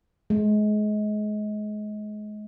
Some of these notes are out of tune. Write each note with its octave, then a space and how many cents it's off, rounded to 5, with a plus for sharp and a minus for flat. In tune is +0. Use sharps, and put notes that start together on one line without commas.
G#3 +30